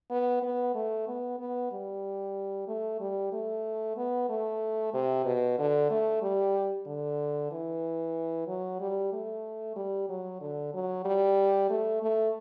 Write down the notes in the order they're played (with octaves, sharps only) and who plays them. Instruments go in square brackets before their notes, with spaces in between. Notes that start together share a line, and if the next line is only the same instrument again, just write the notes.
[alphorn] B3
B3
A3
B3
B3
G3
A3
G3
A3
B3
A3
C3
B2
D3
A3
G3
D3
E3
F#3
G3
A3
G3
F#3
D3
F#3
G3
A3
A3